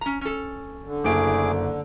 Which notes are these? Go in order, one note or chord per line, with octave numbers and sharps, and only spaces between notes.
C#4 A#5
C#4 A4
D3
F#1 A3 G#4 D6 D7